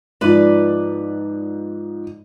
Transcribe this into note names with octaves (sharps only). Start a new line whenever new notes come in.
G#2 F3 B4 D5